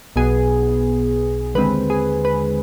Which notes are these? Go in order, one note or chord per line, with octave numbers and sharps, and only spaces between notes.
B1 B2 B3 G#4
D#2 D3 G#3 C4 B4
G#4
B4